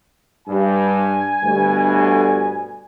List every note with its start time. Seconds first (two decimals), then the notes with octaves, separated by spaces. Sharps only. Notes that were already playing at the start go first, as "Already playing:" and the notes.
0.47 G2 G#5
1.42 D2 G2 B2